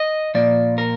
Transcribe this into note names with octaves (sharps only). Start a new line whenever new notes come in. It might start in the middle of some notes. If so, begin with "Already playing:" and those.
Already playing: D#5
A#2 F3 A#3 D5
A#4